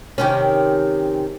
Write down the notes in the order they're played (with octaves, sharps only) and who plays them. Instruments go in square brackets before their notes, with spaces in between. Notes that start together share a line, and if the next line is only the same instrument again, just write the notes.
[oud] C3 D#3 C#4